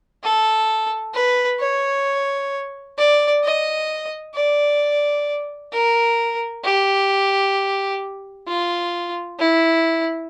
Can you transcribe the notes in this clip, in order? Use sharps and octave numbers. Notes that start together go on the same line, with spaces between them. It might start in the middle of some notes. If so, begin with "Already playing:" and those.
A4
B4
C#5
D5
D#5
D5
A#4
G4
F4
E4